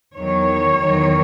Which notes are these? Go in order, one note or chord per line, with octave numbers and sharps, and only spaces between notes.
E2 D#3 F#3 C#5
E2 D#3 F#3